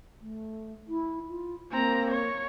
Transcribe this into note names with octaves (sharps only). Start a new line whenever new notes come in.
A3
E4
F4
A#3 C4 A#5
C#5